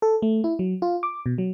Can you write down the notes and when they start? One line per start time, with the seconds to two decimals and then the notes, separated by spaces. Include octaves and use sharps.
0.02 A4
0.22 A3
0.44 E4
0.59 F#3
0.82 F4
1.03 D6
1.26 B2
1.38 F#3